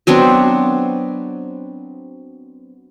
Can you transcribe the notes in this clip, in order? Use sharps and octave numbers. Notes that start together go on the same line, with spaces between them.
F#3 B3 C4 D4